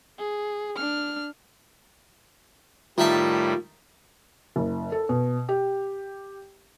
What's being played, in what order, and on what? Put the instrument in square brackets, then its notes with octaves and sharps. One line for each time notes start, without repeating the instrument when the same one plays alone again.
[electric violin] G#4
D4 F6
[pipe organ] A2 G3 [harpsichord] D#3 E5 A5 [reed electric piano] F4
[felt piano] F#1
A4
B2
G4